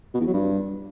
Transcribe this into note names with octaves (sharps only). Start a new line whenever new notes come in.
B2
E2
F#3
G2